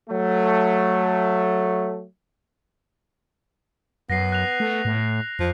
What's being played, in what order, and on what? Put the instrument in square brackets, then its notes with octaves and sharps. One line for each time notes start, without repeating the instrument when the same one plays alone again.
[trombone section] F#3 A3
[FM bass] F#2 [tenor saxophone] B3 [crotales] A#6 C7
[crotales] F#6 F7
[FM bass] A3
A2
[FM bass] F2 [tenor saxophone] F3